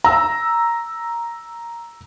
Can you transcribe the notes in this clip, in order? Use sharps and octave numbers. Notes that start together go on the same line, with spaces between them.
A#5 E6